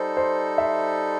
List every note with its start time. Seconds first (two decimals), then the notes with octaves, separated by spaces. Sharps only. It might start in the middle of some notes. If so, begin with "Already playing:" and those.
Already playing: G3 D#4 A4 C5
0.17 C5
0.58 E5